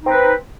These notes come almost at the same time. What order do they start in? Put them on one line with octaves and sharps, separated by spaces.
D#4 C4 B4